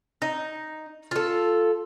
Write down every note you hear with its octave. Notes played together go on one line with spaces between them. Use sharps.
D#4
F4 A4